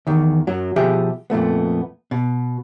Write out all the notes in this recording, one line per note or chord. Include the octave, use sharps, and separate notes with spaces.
E2 D#3
F#2 F#3
B2 F3 G4 G#4 E5
F2 A#2 A3 B3
B2